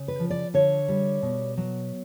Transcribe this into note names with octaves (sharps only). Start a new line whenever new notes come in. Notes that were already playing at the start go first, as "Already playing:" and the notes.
Already playing: C#3
B4
F3
D5
D3 C#5
G3
B2
F#3